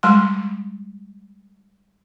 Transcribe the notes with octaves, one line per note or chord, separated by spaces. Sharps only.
G3 G#3 C6